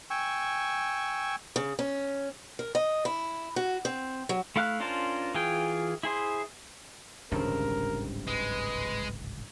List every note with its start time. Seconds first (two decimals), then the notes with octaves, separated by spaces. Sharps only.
0.10 G5 G#5 C#6 E6
1.56 C#3
1.79 C#4
2.59 A#4
2.75 D#5
3.05 E4
3.56 F#4
3.85 C4
4.29 F#3
4.56 A3 E4 F5 F6 F#6
4.80 C#4 D4 F4 A#4 C5
5.34 E3 F4 G#4 G5
6.03 E4 G#4 C5
7.32 D1 G#1 C#2 G2 C#3 C4 A#4
8.27 G#3 B4